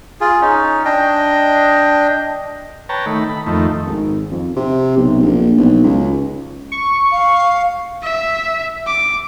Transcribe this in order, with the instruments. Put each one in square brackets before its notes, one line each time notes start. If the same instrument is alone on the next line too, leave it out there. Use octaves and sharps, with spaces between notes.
[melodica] F4 G#4
C#4 D#4
D4 D#5 G5
[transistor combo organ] B4 C#5 G5 A5 A#5
D#3 A3 B5
B5
F2 D#3 A3
[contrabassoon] G#1
F2
C3
B1
A#1
B1
C#2
[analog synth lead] C#6
[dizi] F5
[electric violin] E5
D6